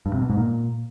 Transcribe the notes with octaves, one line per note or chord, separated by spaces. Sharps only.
G2
C3
B2
G#2
A#2